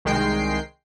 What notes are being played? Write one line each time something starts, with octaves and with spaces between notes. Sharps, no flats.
C2 D#3 G#3 G5 C7